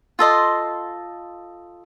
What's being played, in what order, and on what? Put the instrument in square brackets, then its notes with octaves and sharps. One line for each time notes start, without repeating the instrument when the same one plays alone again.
[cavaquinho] F4 A4 D#5 C6